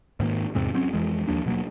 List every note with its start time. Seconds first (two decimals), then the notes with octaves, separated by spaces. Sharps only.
0.20 G#2 D#3 A#3
0.55 E2 G#2 C3 G#3
0.74 F#3 C4 C#4
0.94 F2 E3 G#3
1.28 D#2 F3 A#3 D4
1.46 B2 F#3 A#3